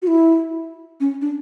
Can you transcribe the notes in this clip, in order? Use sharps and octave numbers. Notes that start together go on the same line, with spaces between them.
F#4
E4
C#4
D4